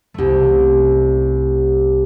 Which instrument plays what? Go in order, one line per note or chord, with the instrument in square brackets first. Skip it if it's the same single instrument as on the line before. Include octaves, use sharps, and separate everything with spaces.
[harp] C2 A3